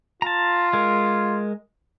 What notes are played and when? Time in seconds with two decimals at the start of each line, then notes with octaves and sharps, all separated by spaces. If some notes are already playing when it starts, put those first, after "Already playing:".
0.22 F4 A5 A#5
0.73 G#3 A#4